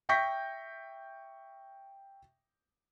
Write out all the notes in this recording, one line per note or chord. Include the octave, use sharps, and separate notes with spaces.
E5 G5 C#6 G6 A#6 B6